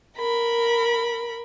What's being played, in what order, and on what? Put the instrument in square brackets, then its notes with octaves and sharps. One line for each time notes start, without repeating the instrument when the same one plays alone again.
[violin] A#4 B5